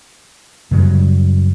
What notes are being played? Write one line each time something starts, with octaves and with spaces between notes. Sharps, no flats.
F#2 C#3 F#3 G3